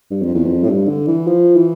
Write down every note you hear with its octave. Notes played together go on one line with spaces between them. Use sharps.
G2
F2
E2
F2
A2
G2
D3
E3
F3
E3